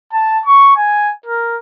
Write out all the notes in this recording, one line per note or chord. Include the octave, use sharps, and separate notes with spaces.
A5
C#6
G#5
A#4